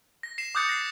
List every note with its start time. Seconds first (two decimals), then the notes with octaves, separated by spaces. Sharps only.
0.23 A#6
0.38 C7 E7
0.55 D6 D#6 F#6 G6 A6 C#7
0.69 A#6 C7